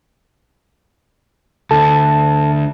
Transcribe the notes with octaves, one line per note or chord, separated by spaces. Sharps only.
D2 A4 A5